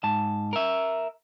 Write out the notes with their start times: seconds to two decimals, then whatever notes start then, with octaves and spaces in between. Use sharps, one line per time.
0.04 G#2 A5
0.53 A#4 E5